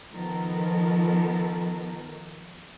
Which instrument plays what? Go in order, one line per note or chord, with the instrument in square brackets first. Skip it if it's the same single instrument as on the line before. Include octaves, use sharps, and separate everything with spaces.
[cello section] D#3 F3 B3 A4 A#4